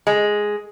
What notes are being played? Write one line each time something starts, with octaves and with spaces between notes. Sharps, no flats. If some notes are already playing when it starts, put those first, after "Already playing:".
G#3